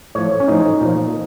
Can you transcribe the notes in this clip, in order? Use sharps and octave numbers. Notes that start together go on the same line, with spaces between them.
A2 F3 C#5
C#4
A2 F3 D#4
A#2 F3